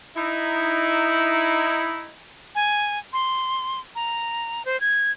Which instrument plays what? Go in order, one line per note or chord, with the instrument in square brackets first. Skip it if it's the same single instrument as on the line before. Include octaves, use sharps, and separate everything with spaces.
[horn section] D#4 E4
[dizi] G#5
C6
A#5
C5
G#6